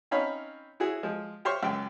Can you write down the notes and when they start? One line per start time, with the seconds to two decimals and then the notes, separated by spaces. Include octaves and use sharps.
0.11 C4 C#4 D#4 C#5 F5 B5
0.80 E4 F#4 G#4
1.03 F3 G#3
1.45 G4 C5 C#5 C6 C#6 F6
1.63 C#2 F#2 G5